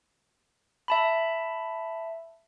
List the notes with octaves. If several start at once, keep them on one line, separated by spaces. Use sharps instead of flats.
E5 A5 B5